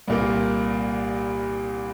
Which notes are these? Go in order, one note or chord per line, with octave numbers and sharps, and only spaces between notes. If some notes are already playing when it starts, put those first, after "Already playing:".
C2 A#2 A#3